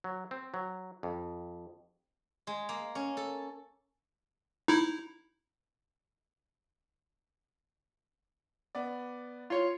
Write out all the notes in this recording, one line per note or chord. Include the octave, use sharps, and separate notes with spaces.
F#3
C4
F#3
F2
G#3
A#3
C#4
A4
D#4 E4
B3 D5
F4 C#5